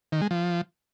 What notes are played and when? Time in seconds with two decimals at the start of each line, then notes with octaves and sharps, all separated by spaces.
0.12 D#3
0.22 G#3
0.31 F3